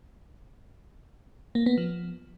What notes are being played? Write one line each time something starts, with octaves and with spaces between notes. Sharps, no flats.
A#3
B3
F3